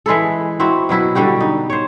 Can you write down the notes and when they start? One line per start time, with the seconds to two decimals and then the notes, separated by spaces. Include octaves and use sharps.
0.06 E3 G#3 E4 A4
0.60 C4 E4 F#4
0.89 B2 F#3 E4 F#4
1.15 D3 G3 F#4 G4
1.40 D#4
1.70 C5 C#5